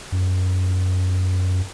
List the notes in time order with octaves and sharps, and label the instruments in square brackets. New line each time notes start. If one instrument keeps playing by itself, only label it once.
[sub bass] F#2